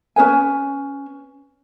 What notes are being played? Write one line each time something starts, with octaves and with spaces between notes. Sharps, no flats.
C#4 G#4 B4 G#5